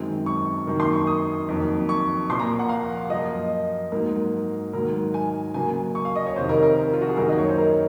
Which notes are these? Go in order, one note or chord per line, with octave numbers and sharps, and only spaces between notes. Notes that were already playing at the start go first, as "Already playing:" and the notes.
Already playing: F#2 D#3 G#3 C4
C#6
F#2 D#3 A#3
C6
C#6
D#6
F2 D#3 F#3 A#3
C#6
A#2 F3 A#3 C6
A#5
F#5
F5
F#2 F3 A#3 D#5
G#2 F#3 A#3 A#4
G#2 D#3 F#3 A#4
G#5
C#3 F#3 A#3 G#5
C#6
F5
D#5
C#5
F2 C3 D#3 C5
A#4
A#4
F4
F#4
G#4
F#2 D#3 A#3 A#4
D#5
C#5
C5
A#4